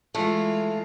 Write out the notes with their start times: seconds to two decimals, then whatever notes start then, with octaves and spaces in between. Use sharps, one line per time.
0.15 E3 G#3 A3 F4